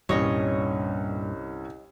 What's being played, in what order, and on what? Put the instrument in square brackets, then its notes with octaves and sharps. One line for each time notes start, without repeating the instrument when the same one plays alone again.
[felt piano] C2 C#4 [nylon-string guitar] G2 A#2 [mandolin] C#5 D#5